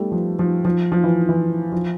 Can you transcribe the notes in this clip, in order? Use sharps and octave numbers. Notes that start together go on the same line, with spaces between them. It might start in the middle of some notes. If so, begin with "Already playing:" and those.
Already playing: G3 A3 B3
F3
F3
F3
F3
E3
E3
F3